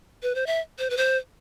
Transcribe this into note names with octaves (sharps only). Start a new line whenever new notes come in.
B4
C5
E5
C5
B4
C5